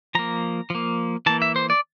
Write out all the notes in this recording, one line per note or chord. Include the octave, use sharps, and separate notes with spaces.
F3 A#3 A#5
F3 A#3
E3 A#3 A5
E5
C5
D5